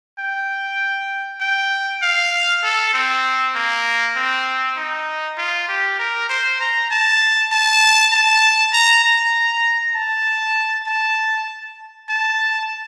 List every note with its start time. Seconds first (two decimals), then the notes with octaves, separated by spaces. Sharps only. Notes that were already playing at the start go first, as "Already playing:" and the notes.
0.19 G5
1.41 G5
2.03 F5
2.64 A4
2.94 C4
3.55 A#3
4.16 C4
4.77 D#4
5.38 F4
5.69 G4
5.99 A#4
6.30 C5
6.60 A#5
6.91 A5
7.52 A5
8.13 A5
8.73 A#5
9.04 A#5
9.95 A5
10.87 A5
12.09 A5